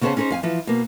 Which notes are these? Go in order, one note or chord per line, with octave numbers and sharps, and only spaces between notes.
C#3 B3 C#4 G#4 C5 A5
C#4 D#4 G#4 A#4 C5
F2 F5 G#5
E3 F3
B2 A#3